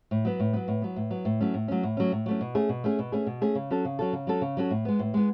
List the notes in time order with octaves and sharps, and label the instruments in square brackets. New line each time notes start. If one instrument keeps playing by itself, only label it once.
[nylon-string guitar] A2
F#3 B3
A2
F#3 B3
A2
F#3 B3
A2
F#3 B3
A2
F#3 A3 C#4
A2
F#3 A3 C#4
A2
F#3 A3 C#4
A2
F#3 A3 C#4
B2
A3 C#4 G#4
B2
A3 C#4 G#4
B2
A3 C#4 G#4
B2
A3 C#4 G#4
C#3
F#3 C#4 F#4 A4
C#3
F#3 C#4 F#4 A4
C#3
F#3 C#4 F#4 A4
C#3
F#3 C#4 F#4 A4
A2
G#3 B3
A2
G#3 B3